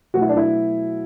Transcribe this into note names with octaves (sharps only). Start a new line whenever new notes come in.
B2 F#3 A3 F#4
E4
D4
E4